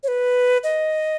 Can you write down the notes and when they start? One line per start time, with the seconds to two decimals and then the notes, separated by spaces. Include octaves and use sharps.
0.03 C#5
0.08 B4
0.63 D#5